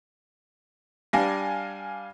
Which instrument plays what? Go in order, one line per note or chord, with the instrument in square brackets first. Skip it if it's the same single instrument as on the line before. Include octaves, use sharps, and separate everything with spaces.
[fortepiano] G3 D4 [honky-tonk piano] F5 G#5 A#6